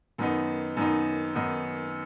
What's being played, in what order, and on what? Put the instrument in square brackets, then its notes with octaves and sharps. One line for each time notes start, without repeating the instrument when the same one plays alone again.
[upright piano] F#2 D#3 B3 D#4
F#2 D#3 B3 D#4
F#2 D#3 B3 D#4